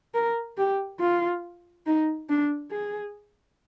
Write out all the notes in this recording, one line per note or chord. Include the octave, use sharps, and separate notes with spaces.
A#4
G4
F4
D#4
D4
G#4